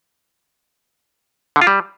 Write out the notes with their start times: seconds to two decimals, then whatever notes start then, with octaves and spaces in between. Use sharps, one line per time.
1.56 D3
1.61 F4
1.67 G3